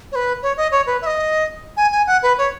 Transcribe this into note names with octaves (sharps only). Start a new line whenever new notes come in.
C#5
B4
C#5
D#5
C#5
B4
E5
D#5
G#5
G#5
F#5
B4
C#5